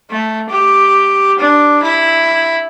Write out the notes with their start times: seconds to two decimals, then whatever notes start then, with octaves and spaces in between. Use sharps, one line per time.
0.11 A3
0.50 G4
1.39 D4
1.83 E4